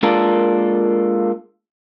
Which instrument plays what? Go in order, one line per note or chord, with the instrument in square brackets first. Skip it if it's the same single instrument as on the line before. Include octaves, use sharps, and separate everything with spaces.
[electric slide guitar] G#3 A#3 D4 F4 A4 A#4